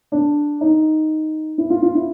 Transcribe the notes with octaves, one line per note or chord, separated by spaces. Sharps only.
D4
D#4
E4
F4
F4
E4